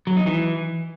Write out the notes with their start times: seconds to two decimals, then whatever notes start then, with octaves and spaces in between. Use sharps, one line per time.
0.07 F#3
0.17 D#4
0.26 E3